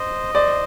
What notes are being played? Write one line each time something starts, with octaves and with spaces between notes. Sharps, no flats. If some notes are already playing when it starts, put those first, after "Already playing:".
Already playing: C5 D#5
C5 D5